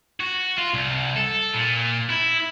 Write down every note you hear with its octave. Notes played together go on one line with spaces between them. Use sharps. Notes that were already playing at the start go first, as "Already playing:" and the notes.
F#4
F4
C2
A4
A#2
E4